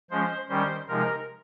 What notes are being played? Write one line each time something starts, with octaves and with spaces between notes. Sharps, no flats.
F3 G#3 C#4 C5
D#3 G3 C#4 C5
C3 F3 G#3 D#4 A#4